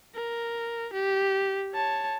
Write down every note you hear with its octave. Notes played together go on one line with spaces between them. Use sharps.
A#4
G4
C#5 A5